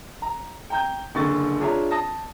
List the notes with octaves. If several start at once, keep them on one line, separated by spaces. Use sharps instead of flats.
A#5
G5 A#5 G6
F#1 D3 C#6 A6
D4 F4 G#4 C#5 E5 A#5
A5 D#6 A#6